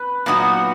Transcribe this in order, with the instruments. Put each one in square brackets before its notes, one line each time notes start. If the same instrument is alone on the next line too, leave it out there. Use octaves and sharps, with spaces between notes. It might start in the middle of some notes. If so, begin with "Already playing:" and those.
Already playing: [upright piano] B4
[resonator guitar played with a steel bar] A#2 F#3 B3 D#4 F#4